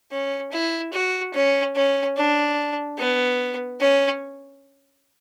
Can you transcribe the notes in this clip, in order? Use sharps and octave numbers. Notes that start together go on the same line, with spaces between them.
C#4
E4
F#4
C#4
C#4
D4
B3
C#4